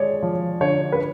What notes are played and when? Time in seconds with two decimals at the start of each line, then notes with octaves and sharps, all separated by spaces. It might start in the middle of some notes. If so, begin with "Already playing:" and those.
Already playing: G#3 C#5 D5
0.22 F3
0.61 D3 C#5
0.92 B4